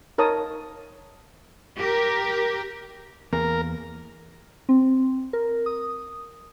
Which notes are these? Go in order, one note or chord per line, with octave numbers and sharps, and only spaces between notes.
D#4 A#4 C#5 A5 D#6
G4 A#4
E2 A#3 A#4
C4
A#4
D#6